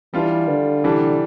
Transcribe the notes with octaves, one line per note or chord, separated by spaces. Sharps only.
E3 G3 D4 F4
D3
C3 E3 G3 D4